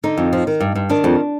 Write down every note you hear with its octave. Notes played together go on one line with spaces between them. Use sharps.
D3 D#4
F2
F3
D#3
G2
G2
D#3 D4
F2